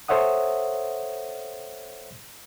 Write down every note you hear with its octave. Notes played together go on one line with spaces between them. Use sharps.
A4 C5 C#5 E5 F#5 D#6